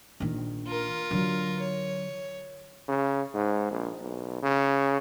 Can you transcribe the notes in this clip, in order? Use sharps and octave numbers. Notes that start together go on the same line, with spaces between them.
A#1 D#3
F4 A#4
D3 F#3
C#5
C#3
G#2
A#1
B1
C#3